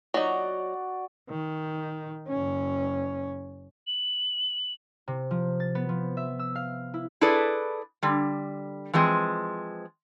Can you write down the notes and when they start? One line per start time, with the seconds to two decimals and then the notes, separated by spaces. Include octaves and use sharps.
0.14 F#3 D#4 F#4 D5 F#5
1.30 D#3
2.28 F#1 C#4
3.87 F#7
5.08 C3
5.31 F3
5.60 A6
5.75 B3
5.89 F3
6.17 E5
6.39 E6
6.55 F5
6.94 E4
7.21 E4 G#4 A4 B4 D5
8.03 D3 G3
8.93 E3 F3 G#3 C4